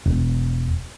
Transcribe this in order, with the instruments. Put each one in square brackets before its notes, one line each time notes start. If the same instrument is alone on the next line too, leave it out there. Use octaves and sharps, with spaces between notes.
[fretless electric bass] E1